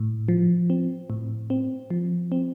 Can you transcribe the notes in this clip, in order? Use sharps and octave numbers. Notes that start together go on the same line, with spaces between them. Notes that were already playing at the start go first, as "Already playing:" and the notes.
Already playing: A2
F3
C4
A2
C4
F3
C4